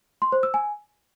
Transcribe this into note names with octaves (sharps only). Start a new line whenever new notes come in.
C6
C5
E6
G#5